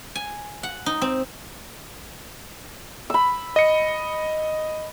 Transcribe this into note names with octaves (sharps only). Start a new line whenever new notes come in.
G#5
F#5
D#4
C4
B5 E6
D#5 C#7